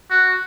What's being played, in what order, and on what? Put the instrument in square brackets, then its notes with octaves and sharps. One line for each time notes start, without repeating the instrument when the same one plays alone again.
[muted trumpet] F#4